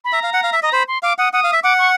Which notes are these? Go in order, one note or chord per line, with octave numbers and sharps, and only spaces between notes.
B5
E5 A#5
F5
F#5
F5
E5
D#5 A#5
C5 B5
C6
F5 D6
F#5 D#6
F#5 D#6
F5
E5
F#5 D6
C#6